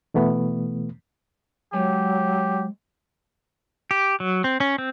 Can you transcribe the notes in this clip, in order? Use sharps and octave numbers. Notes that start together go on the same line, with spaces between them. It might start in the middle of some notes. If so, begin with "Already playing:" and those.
B2 E3 A3 B3
F#3 G#3 G4 C#5 G#5
G4
F#3
C4
C#4
C4